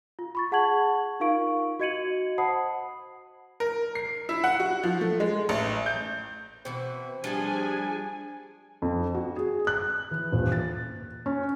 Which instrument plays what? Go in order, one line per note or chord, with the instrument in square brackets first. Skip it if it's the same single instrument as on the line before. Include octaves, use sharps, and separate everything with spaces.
[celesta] F4
B5 C#6 A6
G#4 F#5 A5 C#6 G#6 F#7
D#4 F4 A#4 F5 C#6 D7
F#4 D#5 G#6 C#7 D#7 F#7
C5 F#5 A5 B5 D#6 C7
[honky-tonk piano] A#4
C7
E4
F#5
F#4
F3
A3
G#3
A1
G6
[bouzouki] B2 E3 F#4 [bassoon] C4
[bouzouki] F3 A3 G#4 [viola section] G3 G#5 [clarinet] D4
[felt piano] F2
F#4
G#4
F#6
E3
D#1
A6
C#4